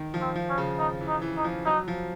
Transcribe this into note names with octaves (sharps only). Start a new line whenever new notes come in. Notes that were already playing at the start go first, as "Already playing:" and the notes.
Already playing: D#3
F3
C4
F3
C#4
C#3
D#4
E3
D#4
E3
D#4
F3
F#3 D#4
F3